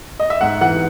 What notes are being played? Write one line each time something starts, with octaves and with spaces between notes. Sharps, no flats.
D#5
E5
G#2 F#5
E3 F#5